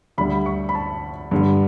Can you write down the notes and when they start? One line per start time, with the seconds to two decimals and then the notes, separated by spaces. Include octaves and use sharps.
0.18 D2 D3 G3 B5
0.46 C#6
0.69 B5
0.75 A5
1.31 G2 D3 G3